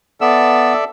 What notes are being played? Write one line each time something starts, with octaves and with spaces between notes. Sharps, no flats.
B3 A4 D5 E5 E6